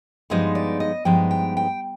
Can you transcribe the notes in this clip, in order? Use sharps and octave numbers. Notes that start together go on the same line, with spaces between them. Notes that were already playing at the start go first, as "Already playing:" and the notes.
G2 F3 G#3 B3 D#4 C5
D5
D#5
G2 F3 G#3 B3 D#4 G5
G5
G5